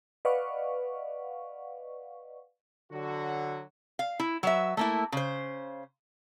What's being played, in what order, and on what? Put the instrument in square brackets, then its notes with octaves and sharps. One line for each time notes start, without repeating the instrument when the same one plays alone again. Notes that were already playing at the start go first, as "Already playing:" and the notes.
[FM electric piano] B4 D5 D#5 F5 F#5 C#6
[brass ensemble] D3 F#3 F#4
[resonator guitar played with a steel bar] F5
E4
F#3 B4 E5
A3 A#3 E4
C#3 C5